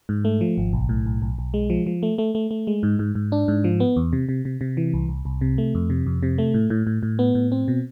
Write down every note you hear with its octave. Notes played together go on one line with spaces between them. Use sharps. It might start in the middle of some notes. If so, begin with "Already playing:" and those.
G#2
A3
F3
G#1
B1
A2
B1
B1
B1
G#3
F3
F3
A3
A3
A3
A3
G#3
G#2
G#2
G#2
D4
G#2
F3
B3
E2
C3
C3
C3
C3
E3
C2
C2
C2
C3
A3
F2
C3
F2
C3
A3
A2
A2
A2
A2
B3
A2
C4
B2